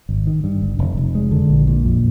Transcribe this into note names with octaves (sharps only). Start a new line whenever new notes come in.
G#1
D#3
G2
G1
F1
F1
G#3
D3
A#1
A#2
F2